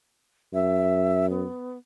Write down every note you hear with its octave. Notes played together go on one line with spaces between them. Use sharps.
F#2 E5
B3